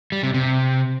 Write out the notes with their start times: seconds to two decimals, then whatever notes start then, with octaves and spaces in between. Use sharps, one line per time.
0.12 G3
0.23 C3
0.34 C3